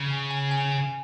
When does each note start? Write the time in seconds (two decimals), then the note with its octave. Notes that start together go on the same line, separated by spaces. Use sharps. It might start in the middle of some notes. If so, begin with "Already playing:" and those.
Already playing: C#3
0.10 G#5
0.30 G#5
0.51 G#5
0.72 G#5